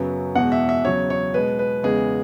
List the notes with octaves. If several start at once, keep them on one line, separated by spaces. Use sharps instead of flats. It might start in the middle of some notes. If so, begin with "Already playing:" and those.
Already playing: F#2 C#3 F#3 B3
E2 B2 G#3 F#5
E5
E5
E2 C#3 F#3 C#5
C#5
B2 G#3 B3 B4
B4
E2 C#3 G#3 B3 G#4